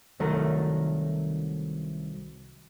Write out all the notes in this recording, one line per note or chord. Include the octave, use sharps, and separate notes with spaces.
C2 D#3 F#3 A3 A4 A#4